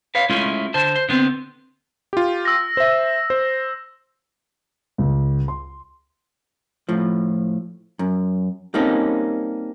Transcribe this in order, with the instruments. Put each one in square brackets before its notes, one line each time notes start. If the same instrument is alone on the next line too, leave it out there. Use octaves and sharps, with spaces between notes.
[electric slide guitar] B4 C#5 F5
G#3 A3 C#4 E4 F4
D3 C5 A5
C5
D3 B3 C4
[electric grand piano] F4 G4
[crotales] E6 A#6
[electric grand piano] C5 E5
C5
[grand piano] C#2
C6
[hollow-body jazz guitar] A2 F3
F#2
G3 A#3 C4 C#4 D#4 A4